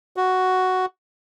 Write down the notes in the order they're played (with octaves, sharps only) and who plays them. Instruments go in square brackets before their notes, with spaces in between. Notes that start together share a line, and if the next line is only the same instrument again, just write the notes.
[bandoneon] F#4